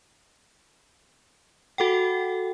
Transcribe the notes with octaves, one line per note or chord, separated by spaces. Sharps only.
F#4 A4 F#5 G5